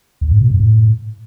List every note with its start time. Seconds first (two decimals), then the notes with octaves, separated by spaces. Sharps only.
0.21 E2
0.31 G#2
0.41 B2
0.50 F#2
0.60 A2